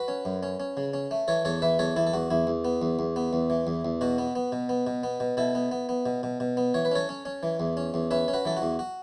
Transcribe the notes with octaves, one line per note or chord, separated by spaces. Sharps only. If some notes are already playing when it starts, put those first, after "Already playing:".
Already playing: F#4 B4
C#4
F#2
C#4
C#4
C#3
C#4
A3
E3 A4 C#5
E2 A4 C#5
E3 B4 E5
E2 A4 C#5
E2 E4 A4
A4
E2 F#4
E2 E4
E2
B3
E2
E2
B3
E2
E3
E2
E2
B2 F#4
B3
B3
B2
B3
B2
B3
B2
B2 E4 A4
B3
B3
B3
B2
B2
B2
B3
E3 C#5
B4
C#4 A4 C#5
C#4
C#4
E3
E2
C#4
E2
C#4 B4 E5
C#4
F#4 B4
E3 A4
F#4
E2
F#4